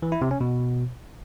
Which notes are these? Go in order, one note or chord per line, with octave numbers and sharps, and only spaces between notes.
E3
E4
C3
C#4
B2